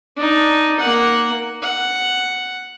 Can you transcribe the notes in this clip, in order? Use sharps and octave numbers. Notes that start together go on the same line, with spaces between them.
D4 D#4
A#3 F#5
F#5